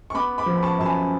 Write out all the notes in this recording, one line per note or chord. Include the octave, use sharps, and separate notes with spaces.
C#6
B3 B5 D6
B5 D6
F3
B5
A5 C#6
F#2 A5
G#5 B5